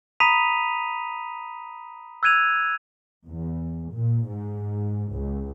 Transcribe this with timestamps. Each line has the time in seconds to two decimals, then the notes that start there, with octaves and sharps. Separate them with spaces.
0.20 A#5 B5 D#6 B6 D#7 F7
2.23 E6 F#6 G#6 D#7 F7
3.27 E2
3.95 A#2
4.29 G#2
5.14 C#2